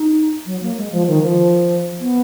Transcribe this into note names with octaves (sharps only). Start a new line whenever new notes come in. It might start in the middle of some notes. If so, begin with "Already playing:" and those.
Already playing: D#4
F#3
A#3
G#3
F3
D#3
F3
B3